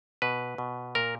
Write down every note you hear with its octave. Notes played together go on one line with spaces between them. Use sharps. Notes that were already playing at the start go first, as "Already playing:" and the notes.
B2 B4
B2
A#2 A#4